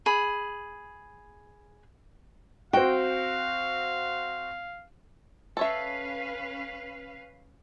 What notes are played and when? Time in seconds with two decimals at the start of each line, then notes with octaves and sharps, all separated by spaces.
0.06 G#4 B5
2.73 C4 F#4 F5 G5
5.57 C#4 A4 B4 C#5 E5 F5